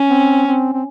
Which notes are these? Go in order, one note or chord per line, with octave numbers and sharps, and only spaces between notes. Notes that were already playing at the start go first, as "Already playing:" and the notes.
Already playing: C#4
C4
C4
C4